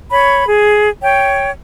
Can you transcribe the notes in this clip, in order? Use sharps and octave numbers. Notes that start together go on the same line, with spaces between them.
C#5 B5
G#4
C#5 G5